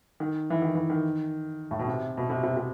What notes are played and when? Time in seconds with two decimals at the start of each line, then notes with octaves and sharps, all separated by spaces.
0.20 D#3
0.50 E3
0.62 D#3
0.75 E3
0.90 D#3
1.71 A2
1.79 B2
1.87 C3
2.17 B2
2.30 C3
2.43 C3
2.57 C3